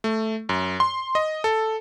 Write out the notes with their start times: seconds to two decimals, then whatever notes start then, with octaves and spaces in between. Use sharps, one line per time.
0.04 A3
0.49 F#2
0.80 C6
1.15 D#5
1.44 A4